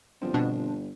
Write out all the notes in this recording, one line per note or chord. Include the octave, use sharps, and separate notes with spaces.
G1 F3 C4
B2 D4